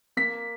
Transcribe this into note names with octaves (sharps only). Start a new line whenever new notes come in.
A#3 B6